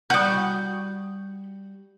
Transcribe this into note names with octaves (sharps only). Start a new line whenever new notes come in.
G3 F#4 C#6 D#6 G6